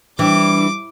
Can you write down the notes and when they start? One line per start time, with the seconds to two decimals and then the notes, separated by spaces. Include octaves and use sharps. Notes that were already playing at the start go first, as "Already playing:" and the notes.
0.19 E3 G3 D4 D6